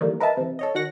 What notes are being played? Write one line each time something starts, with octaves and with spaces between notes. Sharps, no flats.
D#3 E3 G3 A3 A#3
A#4 B4 D#5 E5 A5
C3 E3
A4 C#5 D#5
D#3 F#4 F#5 A#6